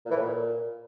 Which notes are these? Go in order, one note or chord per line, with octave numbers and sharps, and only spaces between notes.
A#2
E3
A2
A#2